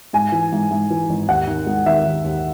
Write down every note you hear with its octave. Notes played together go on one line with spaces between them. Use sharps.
G#2 G#5
E3
G#2
G#2
E3
G#1
D#2 F#5
D#3
G#3
D#3 E5
D#3
D#2